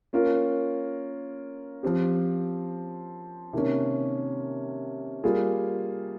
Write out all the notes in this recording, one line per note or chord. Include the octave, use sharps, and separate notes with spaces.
A#3 C#4 F4 A#4
F3 C4 G4
C3 D#3 A#3 C#4
G3 A#3 F4 G#4